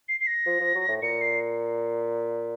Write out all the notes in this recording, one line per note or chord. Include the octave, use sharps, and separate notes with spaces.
C7
C7
A#6
F3
F3
F#3
A2
A#2 C#7
C7